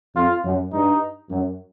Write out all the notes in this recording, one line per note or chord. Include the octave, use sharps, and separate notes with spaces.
F2 F4
F#2
G2 D#4
F#2